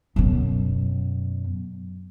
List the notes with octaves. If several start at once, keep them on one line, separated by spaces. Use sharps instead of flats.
F#2 B2